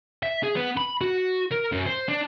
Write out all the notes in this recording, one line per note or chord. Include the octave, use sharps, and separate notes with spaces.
E5
G#4
B3
B5
F#4
A#4
F#2
C5
D4